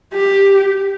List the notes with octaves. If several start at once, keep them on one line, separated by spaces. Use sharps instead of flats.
G4